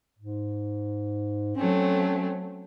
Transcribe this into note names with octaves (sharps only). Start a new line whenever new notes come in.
G#2
F#3 A3 C4 C#4